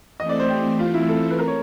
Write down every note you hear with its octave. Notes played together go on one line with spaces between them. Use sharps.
E3 A3 C4 D#5
D5
C5
G4
F4
E4
A4
B4
A#4
C#5